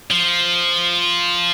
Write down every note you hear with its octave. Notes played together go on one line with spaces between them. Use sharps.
F3